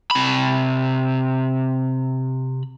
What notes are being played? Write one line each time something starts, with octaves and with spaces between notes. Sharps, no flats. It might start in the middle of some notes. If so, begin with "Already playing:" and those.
C3 B5